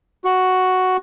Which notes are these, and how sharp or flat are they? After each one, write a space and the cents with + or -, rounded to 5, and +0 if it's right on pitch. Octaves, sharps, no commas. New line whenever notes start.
F#4 +5